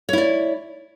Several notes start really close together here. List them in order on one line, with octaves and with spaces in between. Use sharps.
C#5 E4 D5